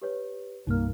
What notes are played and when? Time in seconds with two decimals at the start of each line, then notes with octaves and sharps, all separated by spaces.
0.02 G4 B4 C#5
0.67 C2 G2 A#3 D#4 F6